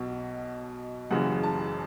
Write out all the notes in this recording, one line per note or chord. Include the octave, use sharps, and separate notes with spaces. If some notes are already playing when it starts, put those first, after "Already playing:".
Already playing: B1 B2
F#1 F#2 C#3 E3 F#5
A5